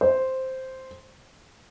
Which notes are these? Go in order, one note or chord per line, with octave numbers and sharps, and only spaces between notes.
C5